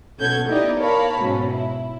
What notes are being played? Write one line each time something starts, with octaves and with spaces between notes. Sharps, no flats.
B2 C#4 A4 F#5 G6 G#6
B3 D#4 E4 G4 D5 D#5
A#4 C#5 F5 A5 B5
G#2 B2 F#3 C#4
E4